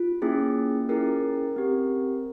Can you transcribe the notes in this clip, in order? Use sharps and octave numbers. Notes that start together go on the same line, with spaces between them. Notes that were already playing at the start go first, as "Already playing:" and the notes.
Already playing: F4
A#3 C#4 E4 G#4
C#4 E4 G#4 A#4
C4 G4